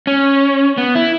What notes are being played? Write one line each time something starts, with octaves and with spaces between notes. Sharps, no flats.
C#4
B3
E4